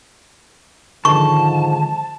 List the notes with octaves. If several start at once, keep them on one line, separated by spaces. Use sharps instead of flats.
G#2 D3 D#3 F3 A5 C#6